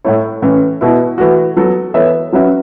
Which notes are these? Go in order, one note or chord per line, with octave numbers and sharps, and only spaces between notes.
A2 A3 E4 C#5
A2 E3 C#4
B2 B3 E4
E3 A3 F#4
F#3 B3 A4
E3 B3 A4 C#5 E5
F#3 C#4 F#4 B4 E5